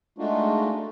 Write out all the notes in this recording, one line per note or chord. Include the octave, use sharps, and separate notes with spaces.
G#3 A3 D4 D#4 F4 F#4